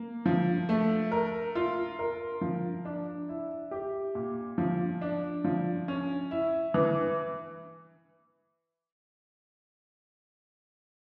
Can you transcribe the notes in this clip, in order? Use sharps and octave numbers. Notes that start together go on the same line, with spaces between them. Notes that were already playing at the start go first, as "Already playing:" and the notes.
Already playing: A#3
F3
A3
A#4
F4
A#4
F3
D4
E4
G4
A#2
F3
D4
F3
C#4
E4
E3